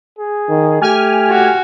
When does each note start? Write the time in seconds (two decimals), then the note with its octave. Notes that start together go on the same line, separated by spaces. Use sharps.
0.19 G#4
0.49 D#3
0.81 A3 G4 G#5 F6
1.30 F#4